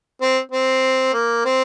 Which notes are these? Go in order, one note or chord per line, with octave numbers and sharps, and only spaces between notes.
C4
C4
A#3
C4